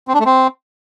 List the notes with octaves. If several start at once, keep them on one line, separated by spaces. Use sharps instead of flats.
C4
D4
A3
C4